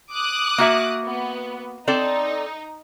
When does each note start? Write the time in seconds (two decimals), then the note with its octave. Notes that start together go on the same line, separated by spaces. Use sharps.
0.12 D6 D#6 F#6
0.58 A#3 F#4 E5
1.04 B3
1.87 C4 D#4 A4 D5